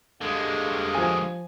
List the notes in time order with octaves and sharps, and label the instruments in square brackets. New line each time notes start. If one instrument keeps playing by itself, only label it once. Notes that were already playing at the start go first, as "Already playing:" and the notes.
[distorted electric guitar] D3 G#3 [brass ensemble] D4 G4 F5
[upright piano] F3 G#5